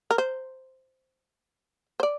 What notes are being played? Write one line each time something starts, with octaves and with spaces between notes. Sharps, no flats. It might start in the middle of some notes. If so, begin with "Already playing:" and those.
A#4
C5
C5
D5